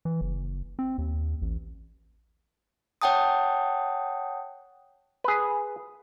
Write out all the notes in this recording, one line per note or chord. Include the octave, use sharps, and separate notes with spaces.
E3
F#1
C4
D#2
A1
C#5 F#5 G5 A5 D#6
G#4 B4